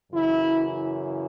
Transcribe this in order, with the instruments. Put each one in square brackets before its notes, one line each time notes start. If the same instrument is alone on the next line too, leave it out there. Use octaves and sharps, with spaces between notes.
[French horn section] F#2 C#3 E3 E4